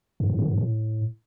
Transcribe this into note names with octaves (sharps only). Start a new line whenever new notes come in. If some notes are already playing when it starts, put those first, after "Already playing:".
F#2
G#2
D3
G2
A2